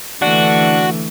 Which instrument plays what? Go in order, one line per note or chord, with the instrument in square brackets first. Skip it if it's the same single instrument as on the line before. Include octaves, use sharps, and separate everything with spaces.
[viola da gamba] D3 E3 A3 [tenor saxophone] D4 [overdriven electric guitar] F#4